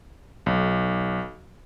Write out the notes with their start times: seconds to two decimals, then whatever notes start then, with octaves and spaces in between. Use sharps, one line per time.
0.46 B1